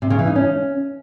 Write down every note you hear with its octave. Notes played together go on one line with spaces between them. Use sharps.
C3
C#3
E3
D#4
C#4